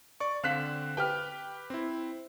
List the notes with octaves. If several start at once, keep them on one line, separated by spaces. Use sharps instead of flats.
D5 C#6
D3 C4 F5 F#6 B6 E7
G4 B4 G5 F6
C4 E4